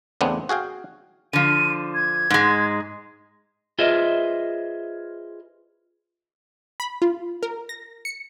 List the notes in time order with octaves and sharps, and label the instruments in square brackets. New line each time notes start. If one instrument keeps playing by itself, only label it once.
[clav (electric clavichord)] E2 A2 C#3 B3 C4 D4
F#4 G#4 F5 G5
[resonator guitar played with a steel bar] D3 F3 [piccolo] D#7
[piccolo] G#6
[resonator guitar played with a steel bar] G#2 G#3
[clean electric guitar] F4 G#4 B4 C5 D#5 E5
[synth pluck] B5
F4
A#4
A#6
C#7